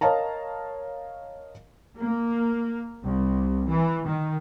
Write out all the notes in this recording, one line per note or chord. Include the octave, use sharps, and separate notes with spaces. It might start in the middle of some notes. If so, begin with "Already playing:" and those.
A#4 C#5 D#5 F5 A5 A#5
A#3
C2
E3
D#3